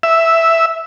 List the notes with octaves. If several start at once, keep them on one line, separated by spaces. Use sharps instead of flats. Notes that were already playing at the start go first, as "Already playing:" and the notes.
E5